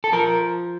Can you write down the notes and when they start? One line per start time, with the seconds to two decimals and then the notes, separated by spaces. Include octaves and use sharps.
0.04 A4
0.13 F3 A#4